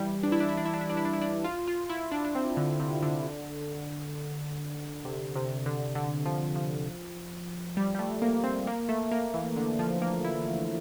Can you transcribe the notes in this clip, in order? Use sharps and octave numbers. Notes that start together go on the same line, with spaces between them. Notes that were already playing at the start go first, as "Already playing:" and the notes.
Already playing: E3 G3
D4
E4
D4
E4
D4
E4
D4
E4
D4
E4
D4
E4
D4
F4
F4
E4
D4
D4
C4
D3
C3
D3
C3
C3
D3
D3
F3
F3
G3
G3
A3
A#3
C4
A#3
A3
A#3
E3
D3
F3
A#3
E4